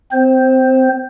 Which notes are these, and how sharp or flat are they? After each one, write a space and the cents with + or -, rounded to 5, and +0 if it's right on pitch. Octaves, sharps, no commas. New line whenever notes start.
C4 -20 C5 +10